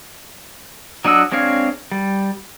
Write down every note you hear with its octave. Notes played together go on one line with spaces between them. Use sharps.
F#3 D4 D#5 F#5 E6
G#3 C4 D4 C#5 F5
G3